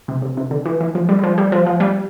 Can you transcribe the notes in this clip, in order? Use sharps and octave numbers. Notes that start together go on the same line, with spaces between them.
C3
C3
C3
D3
E3
E3
F3
G3
G3
F3
G3
F3
F3
G3